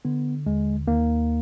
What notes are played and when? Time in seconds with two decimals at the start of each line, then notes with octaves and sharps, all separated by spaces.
0.05 D3 B3
0.46 D#2 G#3
0.88 D#2 A#3